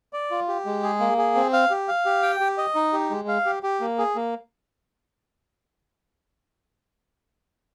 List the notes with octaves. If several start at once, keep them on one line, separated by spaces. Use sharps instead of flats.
D5
F4
G4
G#3
G#4
A#3
G#4
C4
F5
G4
F5
G4
G5
G4
D#5
D#4
G4
G#3
F5
G4
G4
A#3
G#4
A#3